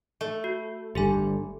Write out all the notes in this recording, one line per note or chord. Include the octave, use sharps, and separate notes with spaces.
A3
F#4
G1 G2 G4 A4 G#5